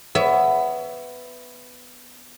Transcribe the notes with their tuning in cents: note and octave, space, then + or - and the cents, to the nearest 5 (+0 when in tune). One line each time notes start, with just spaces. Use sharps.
B3 +10 C#5 +35 E5 +15